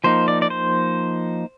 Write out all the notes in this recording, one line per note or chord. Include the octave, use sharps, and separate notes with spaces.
F3 A#3 D#4 C5
D5
D5
C5